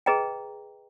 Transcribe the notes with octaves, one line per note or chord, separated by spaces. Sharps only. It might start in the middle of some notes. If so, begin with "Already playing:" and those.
G#4 B4 D#5 G5 A#5